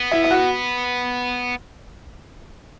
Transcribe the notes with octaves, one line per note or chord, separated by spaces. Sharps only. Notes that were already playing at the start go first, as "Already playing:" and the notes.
Already playing: B3
E4
E4
F#4